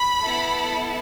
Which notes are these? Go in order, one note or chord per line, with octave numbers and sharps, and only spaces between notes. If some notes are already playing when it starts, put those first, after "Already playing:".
Already playing: B5
B3 E4 A4